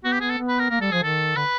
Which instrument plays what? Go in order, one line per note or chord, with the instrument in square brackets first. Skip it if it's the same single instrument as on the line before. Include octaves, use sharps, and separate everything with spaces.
[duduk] B3 [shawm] F#4
[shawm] G4
[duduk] B3 [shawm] G#4
[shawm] A4
[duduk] B3
[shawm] B4
A#4
[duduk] A#3 [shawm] A#4
[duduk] G3 [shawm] A4
[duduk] F3 [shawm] G#4
[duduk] D#3 [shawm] A4
[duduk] D3 [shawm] B4